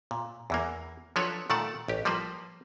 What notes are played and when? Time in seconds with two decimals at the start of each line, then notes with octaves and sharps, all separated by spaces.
0.11 A#2
0.50 E2 E3 A#3
1.16 F3 F#3 D4 A4 B4 C#5
1.50 A#2 D#3 A3 D5 F#5 A5
1.88 A1 G4
2.05 F3 G3 A#3 B4 C5